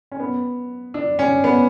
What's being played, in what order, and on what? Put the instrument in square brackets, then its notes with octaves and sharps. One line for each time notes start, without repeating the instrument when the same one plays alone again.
[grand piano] C#4
B3
D4
C#4
B3